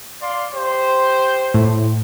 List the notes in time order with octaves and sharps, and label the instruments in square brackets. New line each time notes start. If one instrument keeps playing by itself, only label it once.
[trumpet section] D5 F5 C6
G4 C5
[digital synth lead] A2